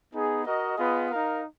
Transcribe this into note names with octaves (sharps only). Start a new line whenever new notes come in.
B3 D#4 G#4
F#4 A#4 D#5
B3 F4 G#4 B4 D#5
D#4 A#4 F5